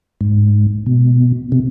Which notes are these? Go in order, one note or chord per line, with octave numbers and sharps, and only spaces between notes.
G#2
B2
C3